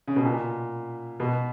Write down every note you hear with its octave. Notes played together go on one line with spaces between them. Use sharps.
C#3
B2
A#2
B2